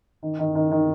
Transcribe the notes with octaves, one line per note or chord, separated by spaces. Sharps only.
D#3
D#3
D#3
D#3